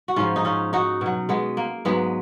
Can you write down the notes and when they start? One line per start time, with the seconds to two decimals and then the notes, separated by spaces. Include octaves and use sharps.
0.08 F#4
0.16 G#2 F3 C#4 F4
0.36 D#4
0.45 C#4 F4
0.73 D#4 F#4
1.01 B2 F#3
1.29 G#3 B3
1.57 A#3
1.85 G#2 F#3 G#3 B3